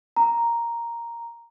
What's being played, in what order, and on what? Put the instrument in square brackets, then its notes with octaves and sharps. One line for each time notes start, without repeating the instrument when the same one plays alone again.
[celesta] A#5